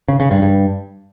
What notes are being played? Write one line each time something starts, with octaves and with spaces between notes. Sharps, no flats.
C#3
C#3
G2
G2